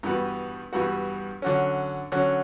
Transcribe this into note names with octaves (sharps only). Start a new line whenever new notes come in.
G2 E3 G3 B3 F#4
G2 E3 G3 B3 F#4
D3 F#3 C#4
D3 F#3 C#4